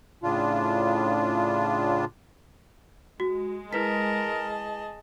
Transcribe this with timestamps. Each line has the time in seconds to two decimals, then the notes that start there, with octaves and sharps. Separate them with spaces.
0.23 A2 C#3 D4 F4
3.20 G#3 F#4
3.73 E4 G#4 A#4 B4 D#5 A5 B6